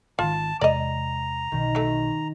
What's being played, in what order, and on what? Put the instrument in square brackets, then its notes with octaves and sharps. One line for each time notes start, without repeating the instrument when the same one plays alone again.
[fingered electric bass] G#1 D#3 [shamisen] F4 [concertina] A5
[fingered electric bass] E2 C3 G#3 [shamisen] D5 D#5 [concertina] A#5
[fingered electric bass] B1 B2 [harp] D#3
[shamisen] F#3 A3